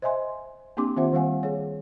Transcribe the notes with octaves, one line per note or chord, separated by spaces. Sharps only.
C5 D#5 E5 G#5 C6
A#3 C4 D4 G4 C6 D6
D#3 C4 F4 C5 E5 F#5
D#3 G3 F5 F#5 G#5
G#4 C#5